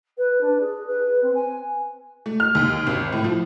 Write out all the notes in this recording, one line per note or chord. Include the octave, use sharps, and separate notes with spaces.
B4
D4
G#4
B4
C4
G#5
A3
F6
D#2
G#1
A2
F3